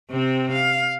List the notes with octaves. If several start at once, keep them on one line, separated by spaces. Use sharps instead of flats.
C3 C4
F5